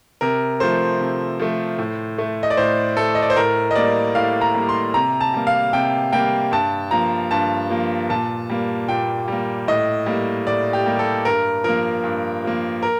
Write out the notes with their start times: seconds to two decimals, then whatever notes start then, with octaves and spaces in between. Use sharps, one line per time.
0.21 C3 A#4
0.60 F3 A3 C5
1.01 C3
1.39 F3 A3
1.78 A2
2.18 A3
2.43 D#5
2.50 D5
2.57 A2 C5
2.97 A3 A4
3.15 D#5
3.22 D5
3.30 C5
3.36 A2 A#4
3.71 D#5
3.76 G3 A#3 D5
4.15 A2 F5
4.41 A#5
4.54 G3 A#3
4.69 C6
4.94 C3 A#5
5.21 A5
5.34 G3 A#3
5.47 F5
5.73 C3 G5
6.13 G3 A#3 G5
6.52 G2 A5
6.91 F3 A#3 A#5
7.31 G2 A5
7.70 F3 A#3
8.10 A#2 A5
8.50 G3 A#3
8.88 A#2 G5
9.28 G3 A#3
9.68 A2 D#5
10.06 G3 A#3
10.47 A2 D5
10.73 G4
10.86 G3 A#3
10.99 A4
11.25 G2 A#4
11.64 F3 A#3 A#4
12.04 G2
12.44 F3 A#3
12.83 A#4